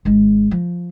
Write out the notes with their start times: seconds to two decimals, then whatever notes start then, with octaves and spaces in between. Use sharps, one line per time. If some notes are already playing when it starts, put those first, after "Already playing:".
0.05 G#1 G#3
0.51 F3